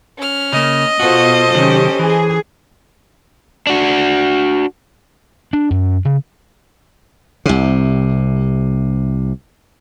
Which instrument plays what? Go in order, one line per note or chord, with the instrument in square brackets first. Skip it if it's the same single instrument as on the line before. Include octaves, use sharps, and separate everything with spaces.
[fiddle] C#4 F6
[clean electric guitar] C#3 A#3 [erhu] D#5
[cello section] B2 F4 [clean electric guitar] F#4 [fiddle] A4 C5
[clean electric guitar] C3 D#3 F#3 [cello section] C#4 G4
[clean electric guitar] E3 [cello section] G#4
[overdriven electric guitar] D4 F#4
[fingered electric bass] D4
F#2
C#3
[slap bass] C2 C3